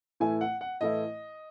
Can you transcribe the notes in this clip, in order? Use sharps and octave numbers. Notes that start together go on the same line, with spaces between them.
A2 E3 A3 E4 G#5
F#5
F#5
A2 E3 A3 E4 D#5